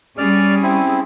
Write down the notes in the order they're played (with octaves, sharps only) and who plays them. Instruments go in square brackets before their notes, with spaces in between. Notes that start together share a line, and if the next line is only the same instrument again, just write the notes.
[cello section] G3 C#4 G#4 [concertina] D5 F6
[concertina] C4 E4